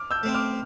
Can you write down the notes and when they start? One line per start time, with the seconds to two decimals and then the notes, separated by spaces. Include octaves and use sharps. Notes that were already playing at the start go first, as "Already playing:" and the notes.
Already playing: D6 F6
0.11 E6 G6
0.23 A3 C4
0.35 D6 F6